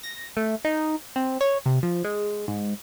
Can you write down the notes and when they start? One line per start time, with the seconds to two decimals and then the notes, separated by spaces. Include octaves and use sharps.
0.03 A#6
0.37 A3
0.65 D#4
1.16 C4
1.41 C#5
1.66 C3
1.83 F3
2.04 G#3
2.48 G#2